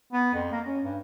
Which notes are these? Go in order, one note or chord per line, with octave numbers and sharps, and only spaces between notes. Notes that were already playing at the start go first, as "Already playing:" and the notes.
B3
F2
A#3
C#4
G2